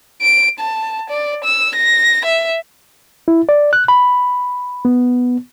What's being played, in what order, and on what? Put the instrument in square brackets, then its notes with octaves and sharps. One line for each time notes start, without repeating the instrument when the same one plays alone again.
[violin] D7
A5
D5
E6
A#6
E5
[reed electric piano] E4
D5
F#6
B5
B3